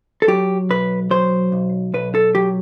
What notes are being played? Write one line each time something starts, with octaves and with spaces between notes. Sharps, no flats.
A4
F#3 G4
B1 B4
F#3 C5
B1
B1 B4
A4
F#3 G4